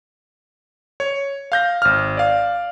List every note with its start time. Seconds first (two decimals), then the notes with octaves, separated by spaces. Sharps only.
1.00 C#5
1.52 F5 G6 A#6
1.82 G#1 F6
2.17 D5 F5